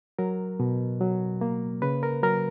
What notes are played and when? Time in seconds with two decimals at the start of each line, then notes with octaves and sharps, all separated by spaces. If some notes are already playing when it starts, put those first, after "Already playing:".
0.19 F#3 A#4
0.60 B2
1.01 F#3
1.41 A#3
1.82 C#3 B4
2.03 A#4
2.23 F#3 A#4